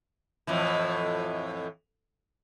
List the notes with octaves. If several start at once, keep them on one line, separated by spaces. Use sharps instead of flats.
F2 A2 E3